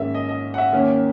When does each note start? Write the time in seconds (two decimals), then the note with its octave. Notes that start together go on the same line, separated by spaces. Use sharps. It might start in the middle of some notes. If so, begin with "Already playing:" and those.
Already playing: G#2 D#3 A#3 C#4 E5
0.14 D#5
0.29 D#5
0.54 F#5
0.58 E5
0.72 D#2 D#3 A#3 C#4